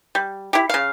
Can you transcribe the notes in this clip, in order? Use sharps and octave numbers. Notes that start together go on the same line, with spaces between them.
G3
E4 G4
C#3 F5